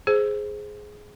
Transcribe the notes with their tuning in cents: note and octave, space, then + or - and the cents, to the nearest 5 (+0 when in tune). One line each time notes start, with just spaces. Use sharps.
G#4 +10 C5 +0